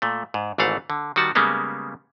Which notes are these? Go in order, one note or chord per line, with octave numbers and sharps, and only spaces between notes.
A#2 A3
G#2
G#1 G#2 E3 A3 F5 F#5
D3
D#3 G3 F#4 A5
C#3 G3 G#3 A#3 B3